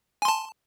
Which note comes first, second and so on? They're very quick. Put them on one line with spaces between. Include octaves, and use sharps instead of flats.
G#5 C6 A5